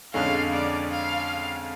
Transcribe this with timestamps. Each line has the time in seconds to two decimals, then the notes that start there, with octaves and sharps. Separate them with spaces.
0.14 F2 D3 G#3 C#4 F5
0.52 D5
0.91 F5